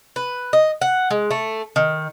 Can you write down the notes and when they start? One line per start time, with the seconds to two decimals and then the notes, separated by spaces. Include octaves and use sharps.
0.16 B4
0.53 D#5
0.81 F#5
1.11 G#3
1.31 A3
1.76 D#3